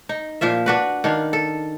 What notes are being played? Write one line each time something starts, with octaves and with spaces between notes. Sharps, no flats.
D#4
A#2 F3 F4 E5
D4 F#4 B4
D#3 D4 F5
A4